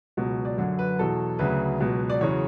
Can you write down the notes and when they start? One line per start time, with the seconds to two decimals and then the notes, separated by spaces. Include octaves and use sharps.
0.17 C#2 B2 F#3
0.45 D5
0.57 F#2 D3 F#3
0.79 B4
0.99 E2 B2 F#3 A4
1.39 D2 C#3 F#3 B4
1.80 C#2 B2 F#3
2.10 D5
2.21 E2 C#3 F#3 C#5